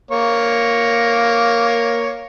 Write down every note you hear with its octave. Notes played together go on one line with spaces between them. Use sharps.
A#3 C#5